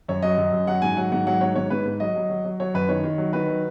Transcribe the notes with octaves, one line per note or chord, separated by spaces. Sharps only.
F#2 C#5
F#3 D#5
F#2
F#2
F#3 F#5
G#2 G#5
F#3 F#5
G#2 F#5
F#3 F#5
G#2 C#5
G#2 C#5
G#2 B4
G#2
F#3 D#5
F#3
F#3
F#3
F#3 C#5
F#2 B4
D#3 C#5
D#3
F#3
D#3 B4
F#3